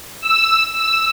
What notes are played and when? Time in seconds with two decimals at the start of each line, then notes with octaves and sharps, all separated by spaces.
0.22 E6
0.75 E6